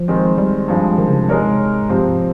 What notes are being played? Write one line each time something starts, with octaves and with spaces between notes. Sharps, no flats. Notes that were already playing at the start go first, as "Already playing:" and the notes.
Already playing: F3
D#3 G#3 C4
G3
G2 F3 G#3 C4
D#3
C#3
C3
G#3 D#4 A#4 C#5
G#2
G2 C3 F3 C4
G#2